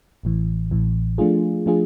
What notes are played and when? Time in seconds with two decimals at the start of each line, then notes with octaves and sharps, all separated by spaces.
0.23 A1 A2 E3
0.71 A1 A2 E3
1.18 F3 A3 D4 F4 G#4
1.66 F3 A3 D4 F4 G#4